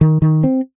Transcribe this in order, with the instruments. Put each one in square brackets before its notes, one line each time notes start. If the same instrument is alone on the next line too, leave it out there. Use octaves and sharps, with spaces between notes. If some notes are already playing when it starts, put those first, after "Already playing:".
[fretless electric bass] D#3
D#3
C4